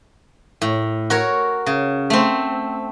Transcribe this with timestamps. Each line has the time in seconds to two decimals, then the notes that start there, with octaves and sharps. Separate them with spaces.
0.62 A2
1.10 F#4 A#4 C#5
1.66 C#3
2.10 A3 C4